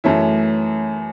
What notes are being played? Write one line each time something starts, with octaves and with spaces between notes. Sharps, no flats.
F#2 E3 A3 C#4 E4